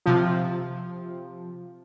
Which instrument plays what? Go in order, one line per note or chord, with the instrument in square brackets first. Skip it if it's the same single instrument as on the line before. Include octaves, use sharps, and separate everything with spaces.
[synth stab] C3 F3